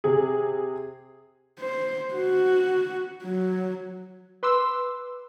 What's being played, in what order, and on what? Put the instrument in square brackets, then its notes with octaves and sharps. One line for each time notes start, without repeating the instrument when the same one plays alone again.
[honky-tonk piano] C3 G#4
[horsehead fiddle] C5
F#4
F#3
[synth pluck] B4 C6 D6 E6